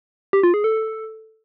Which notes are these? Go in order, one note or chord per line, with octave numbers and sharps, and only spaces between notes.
G4
F4
G#4
A4